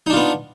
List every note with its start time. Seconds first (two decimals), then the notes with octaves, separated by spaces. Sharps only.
0.07 D#4
0.10 D4
0.13 F4
0.16 B3